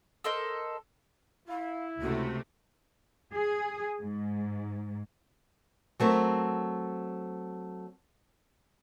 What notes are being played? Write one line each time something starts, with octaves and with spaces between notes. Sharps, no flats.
A4 A#4 C5 D#5
E4 F5
C#2 C3 A3 F#4
G#4
G#2
F#3 A3 C4 A#4